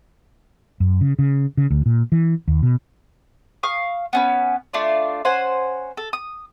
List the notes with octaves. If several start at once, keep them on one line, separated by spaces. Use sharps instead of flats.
F#2
C#3
C#3
C#3
D2
A#2
E3
D#2
B2
F5 C#6 D#6
B3 C#4 B4
A3 D4 F4 D5
C#4 C5 F#5 G#5
A4
D#6